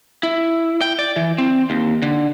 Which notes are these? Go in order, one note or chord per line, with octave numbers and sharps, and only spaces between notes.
E4
G5
D5
E3
C4
D#2
D3